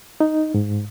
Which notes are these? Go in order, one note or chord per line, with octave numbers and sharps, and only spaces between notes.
D#4
G#2